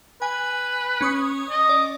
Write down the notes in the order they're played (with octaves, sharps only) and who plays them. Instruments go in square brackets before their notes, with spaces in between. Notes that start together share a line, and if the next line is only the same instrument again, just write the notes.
[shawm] B4 [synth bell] G#5
[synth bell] C#4 C#6 D#6
[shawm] D#5
[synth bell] D5